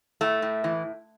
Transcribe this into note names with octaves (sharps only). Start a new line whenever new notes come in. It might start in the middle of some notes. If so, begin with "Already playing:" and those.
A2 A3
A2
E3